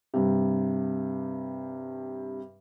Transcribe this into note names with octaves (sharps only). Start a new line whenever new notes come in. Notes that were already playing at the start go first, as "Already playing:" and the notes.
G2 C3